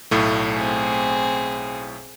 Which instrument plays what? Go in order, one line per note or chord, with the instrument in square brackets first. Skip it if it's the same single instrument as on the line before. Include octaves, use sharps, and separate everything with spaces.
[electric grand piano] B1 A2 A3
[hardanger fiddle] C4 G#4